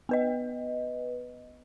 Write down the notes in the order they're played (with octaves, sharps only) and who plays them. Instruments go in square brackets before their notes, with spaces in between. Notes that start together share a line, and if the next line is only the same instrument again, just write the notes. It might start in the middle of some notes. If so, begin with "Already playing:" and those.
[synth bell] B3 B4 D#5